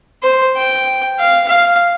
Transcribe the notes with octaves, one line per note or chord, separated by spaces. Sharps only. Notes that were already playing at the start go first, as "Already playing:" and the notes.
C5
G5
F5
F5